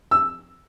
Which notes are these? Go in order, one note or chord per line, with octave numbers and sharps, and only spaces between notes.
E6